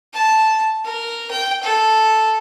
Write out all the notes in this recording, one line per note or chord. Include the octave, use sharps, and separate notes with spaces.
A5
A#4
G5
A4